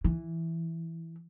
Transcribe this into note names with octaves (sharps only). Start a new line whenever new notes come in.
E3